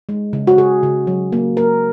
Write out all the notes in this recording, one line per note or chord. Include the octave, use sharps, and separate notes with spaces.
G#3
C#3
F#4
C#3 G#4
C#3
F#3
A#3
A#3 A#4